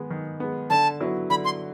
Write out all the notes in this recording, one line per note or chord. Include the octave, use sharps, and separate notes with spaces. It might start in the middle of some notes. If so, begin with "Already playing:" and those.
Already playing: D#3 G#3 B3
D#3
G#3 B3
D3 A5
F#3 B3 E4
D3 B5
C6